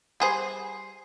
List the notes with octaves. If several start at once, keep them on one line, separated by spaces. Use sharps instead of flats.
G3 G#4 C5